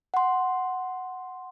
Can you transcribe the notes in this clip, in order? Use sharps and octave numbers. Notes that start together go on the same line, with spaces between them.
F#5 C6